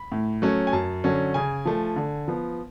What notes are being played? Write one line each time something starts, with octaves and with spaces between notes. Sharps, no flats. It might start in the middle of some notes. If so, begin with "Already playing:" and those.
Already playing: B5
A2
F#3 A3 C#4
G#5
F#2 A5
D3 F#3 C#4
C#3 G#5
F3 A3
D3
F3 B3